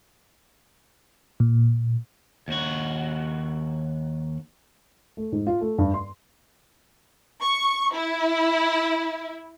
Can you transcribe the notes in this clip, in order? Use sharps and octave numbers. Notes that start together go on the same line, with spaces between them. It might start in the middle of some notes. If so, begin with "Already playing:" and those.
A#2
D#2 F#4
A3
G#2
F4
A3
G2
C6
C#6
E4